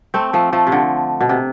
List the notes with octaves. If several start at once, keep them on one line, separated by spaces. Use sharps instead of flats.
A3 C4
F3 A3
F3 A3
C3
D3
B2
C3